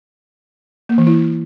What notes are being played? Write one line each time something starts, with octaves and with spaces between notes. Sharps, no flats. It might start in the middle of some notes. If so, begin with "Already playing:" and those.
A#3
E3
E4